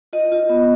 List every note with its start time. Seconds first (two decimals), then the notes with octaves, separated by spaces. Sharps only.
0.13 F4 D#5
0.32 F4
0.50 B3